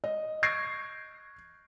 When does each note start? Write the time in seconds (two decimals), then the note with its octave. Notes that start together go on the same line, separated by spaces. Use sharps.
0.04 D#5
0.43 C#6 G6 G#6 A#6 C7 D7